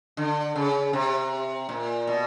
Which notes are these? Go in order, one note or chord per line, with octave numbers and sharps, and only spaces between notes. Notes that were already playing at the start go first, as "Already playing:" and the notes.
D3
C#3
C3
A#2
B2